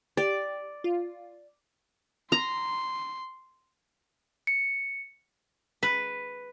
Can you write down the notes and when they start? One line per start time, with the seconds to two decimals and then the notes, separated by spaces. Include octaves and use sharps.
0.17 G4 D5
0.84 F4
2.32 A#5 C6
4.47 C#7
5.83 B4